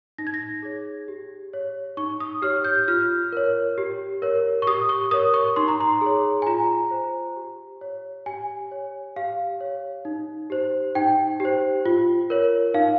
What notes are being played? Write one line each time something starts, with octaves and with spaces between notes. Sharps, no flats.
D#4 A#6
G#6
A#6
G#4 C#5
G4
C#5
D#4 C#6
D#6
G4 C#5 F6
G6
F4 F6
A#4 C#5
G4
A#4 C#5
C#6
G4 D#6
C#6
A#4 C#5 D#6
C#6
D#4 C6
A#5
C6
G#4 C#5
G#5
F4 A#5
C5
G4
C#5
G4 G#5
C#5
G4 F5
C#5
D#4
G4 C5
D#4 G5
G4 C5
F4
A#4 C#5
D#4 F5